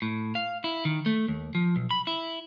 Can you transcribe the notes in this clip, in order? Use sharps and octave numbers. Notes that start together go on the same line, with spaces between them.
A2
F5
E4
D#3
A3
D#2
F3
B1
B5
E4